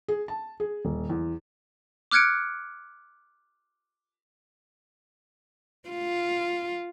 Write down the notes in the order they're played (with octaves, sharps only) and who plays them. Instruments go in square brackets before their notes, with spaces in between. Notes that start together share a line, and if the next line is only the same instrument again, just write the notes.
[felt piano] G#4
A5
G#4
D#1
E2
[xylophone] D6 F6 F#6 G#6 C#7 D7
[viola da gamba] F4